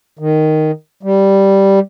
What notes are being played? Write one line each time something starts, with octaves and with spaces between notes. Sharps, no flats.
D#3
G3